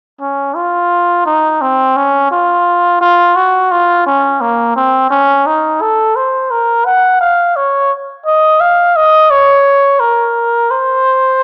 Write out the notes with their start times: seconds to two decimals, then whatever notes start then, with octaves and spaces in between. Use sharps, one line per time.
0.21 C#4
0.56 F4
1.26 D#4
1.61 C4
1.96 C#4
2.31 F4
3.01 F4
3.36 F#4
3.71 F4
4.06 C#4
4.41 A#3
4.76 C4
5.10 C#4
5.46 D#4
5.81 A4
6.16 C5
6.51 A#4
6.85 F#5
7.21 F5
7.56 C#5
8.26 D#5
8.61 F5
8.96 D#5
9.31 C#5
10.00 A#4
10.71 C5